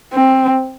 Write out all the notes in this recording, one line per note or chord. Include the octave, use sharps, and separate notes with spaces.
C4